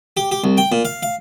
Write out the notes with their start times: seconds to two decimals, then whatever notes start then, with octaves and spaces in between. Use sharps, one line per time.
0.17 G4
0.31 G4
0.44 C2
0.57 G5
0.72 A#2
0.85 F5
1.03 F5